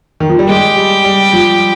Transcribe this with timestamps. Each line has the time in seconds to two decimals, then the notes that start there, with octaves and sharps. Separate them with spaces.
0.20 D#3
0.29 F3
0.39 G3
0.48 G#3 G4
0.77 G3
1.04 G3
1.33 F3